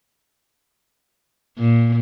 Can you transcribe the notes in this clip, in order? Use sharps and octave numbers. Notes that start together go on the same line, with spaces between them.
A#2